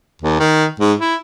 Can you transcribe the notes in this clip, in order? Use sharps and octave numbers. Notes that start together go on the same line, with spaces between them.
D#2
D#3
G#2
E4